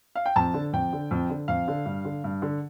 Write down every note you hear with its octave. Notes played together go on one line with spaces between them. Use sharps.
F5
G5
F2 A5
D3
F2 G5
D3
F2
D3
F2 F5
D3
G2
D3
G2
D3